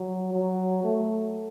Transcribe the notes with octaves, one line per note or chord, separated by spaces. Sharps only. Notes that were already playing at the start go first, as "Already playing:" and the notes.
Already playing: F#3
F#3
A3